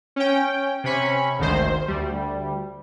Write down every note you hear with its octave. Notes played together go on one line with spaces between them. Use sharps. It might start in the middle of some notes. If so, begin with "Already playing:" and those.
C#4 G5
C3 C#4 B5 C#6
G#1 D2 D#3 C5
D2 G3